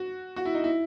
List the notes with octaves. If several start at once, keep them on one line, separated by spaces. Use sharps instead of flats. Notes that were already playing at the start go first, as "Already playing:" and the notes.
Already playing: F#4
F#4
E4
D#4
E4